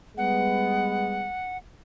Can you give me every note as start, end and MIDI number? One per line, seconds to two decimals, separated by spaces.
0.18 1.30 55
0.18 1.30 56
0.18 1.30 59
0.18 1.57 78